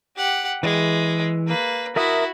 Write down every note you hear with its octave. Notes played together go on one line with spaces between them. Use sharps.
G4 F#5
E3 G#3
A#3 B4
E4 F#4 A#4 E5 D#6